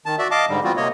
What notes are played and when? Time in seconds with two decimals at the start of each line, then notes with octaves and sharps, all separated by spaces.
0.06 D#3 A5
0.19 F#4 D5 E5
0.31 D#5 F5 A5 D6
0.49 G#2 D3 G3
0.64 E3 G3 B3 C4 F4 F#4
0.76 C3 A#3 C#5 D#5